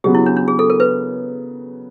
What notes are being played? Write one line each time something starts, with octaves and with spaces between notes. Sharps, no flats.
C#3 F#3 B3 G4
E4
D4
D4
G#4
A4
A#4
B4